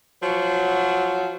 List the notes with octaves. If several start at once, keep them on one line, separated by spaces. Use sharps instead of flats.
F3 F#3